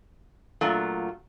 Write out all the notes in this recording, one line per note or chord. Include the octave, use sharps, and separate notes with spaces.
A#2 F#3 A3 D4 F4